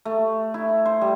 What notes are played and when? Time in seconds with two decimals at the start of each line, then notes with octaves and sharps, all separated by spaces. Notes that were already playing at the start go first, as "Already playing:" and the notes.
0.05 A3
0.54 E4
0.86 C5
1.01 G3